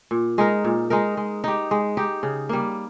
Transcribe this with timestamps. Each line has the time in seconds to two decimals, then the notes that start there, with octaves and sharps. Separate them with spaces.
0.11 A#2
0.38 G#3 D#4 A#4
0.64 A#2
0.90 G#3 D#4 A#4
1.17 G#3
1.44 D#4 G4
1.71 G#3
1.97 D#4 G4
2.23 C#3
2.49 G3 A#3